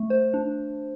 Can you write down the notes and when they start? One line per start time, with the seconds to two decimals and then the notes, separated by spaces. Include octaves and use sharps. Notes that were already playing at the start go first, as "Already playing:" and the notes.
Already playing: A3
0.10 C5
0.34 D4